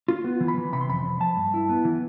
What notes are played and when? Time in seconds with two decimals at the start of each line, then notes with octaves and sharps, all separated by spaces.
0.08 F4
0.24 B3
0.40 E3
0.48 B5
0.57 E3
0.73 C3 B5
0.81 C6
0.89 F2 B5
1.05 F2
1.20 F3 A5
1.37 G2
1.54 E4
1.69 B3
1.85 E3